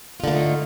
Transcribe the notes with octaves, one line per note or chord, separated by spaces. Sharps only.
D3 A3 A#3 D#4 F4